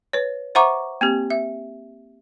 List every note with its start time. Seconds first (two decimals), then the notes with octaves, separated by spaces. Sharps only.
0.13 B4 C#5
0.55 C5 E5 F#5 A#5 C#6 D6
1.01 A#3 C4 G4
1.30 E5